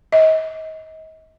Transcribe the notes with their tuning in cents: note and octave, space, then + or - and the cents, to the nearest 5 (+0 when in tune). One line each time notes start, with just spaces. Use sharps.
D#5 +35